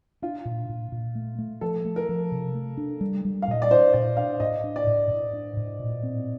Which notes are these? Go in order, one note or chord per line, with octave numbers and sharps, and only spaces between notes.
D4 F4
A#2
A#2
A#2
A3
A3
F3 A4
A3
A#4
F3
C3
A3
D4
G3
G3
F5
A#2 D#5
D5
D4 C5
A#2 D5
D4 F5
A2 D#5
D4
D5
A2
A2
D4
A2
A#2
C4